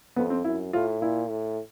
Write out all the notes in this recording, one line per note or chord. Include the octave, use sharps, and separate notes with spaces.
F2 B3
C4
F#2 E4
A2 F4
A#2 E4
A2